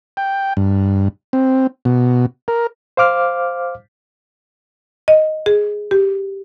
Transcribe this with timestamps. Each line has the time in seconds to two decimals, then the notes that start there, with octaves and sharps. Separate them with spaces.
0.17 G5
0.57 G2
1.33 C4
1.85 B2
2.48 A#4
2.97 C5 F5 D6 F6
5.08 D#5
5.46 G#4
5.91 G4